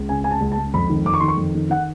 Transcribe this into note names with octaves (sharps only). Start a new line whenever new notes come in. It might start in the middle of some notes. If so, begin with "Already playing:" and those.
Already playing: C#2
C#3 G#5
C#3 G#5
A5
C#2
A5
C#2
F2 B5
D#3
F2 D6
C#6
D#3 C6
C#6
F2
D#3
D#3 F#5